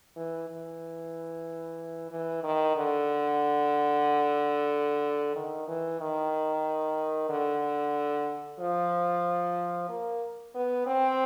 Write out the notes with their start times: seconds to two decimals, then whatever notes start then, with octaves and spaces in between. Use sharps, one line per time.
0.16 E3
0.49 E3
2.11 E3
2.43 D#3
2.76 D3
5.35 D#3
5.68 E3
6.00 D#3
7.29 D3
8.60 F3
9.89 A#3
10.55 B3
10.87 C4